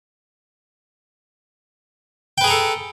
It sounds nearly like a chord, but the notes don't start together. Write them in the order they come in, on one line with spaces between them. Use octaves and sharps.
G5 B4 G#4 A#5 A4